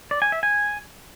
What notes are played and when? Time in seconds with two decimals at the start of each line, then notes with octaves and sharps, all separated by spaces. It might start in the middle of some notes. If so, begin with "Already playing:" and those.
0.11 D5
0.22 G#5
0.32 E5
0.43 G#5